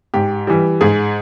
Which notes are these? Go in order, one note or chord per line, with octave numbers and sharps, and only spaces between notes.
G#2 G4
E3 G3
G#2 G#4